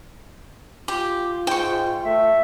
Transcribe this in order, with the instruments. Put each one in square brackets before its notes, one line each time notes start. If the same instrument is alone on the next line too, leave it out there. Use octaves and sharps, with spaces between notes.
[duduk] F4 [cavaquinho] G4
[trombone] G#2 [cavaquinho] G5 C#6
[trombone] A3 [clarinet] E5